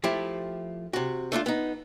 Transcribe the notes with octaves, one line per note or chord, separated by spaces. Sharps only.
F3 A3 E4 G4
C3 F#4
A3 D4 D#4 F4
B3 D#4